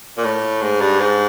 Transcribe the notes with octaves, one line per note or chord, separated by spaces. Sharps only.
A#2
A2
G#2
G2
G#2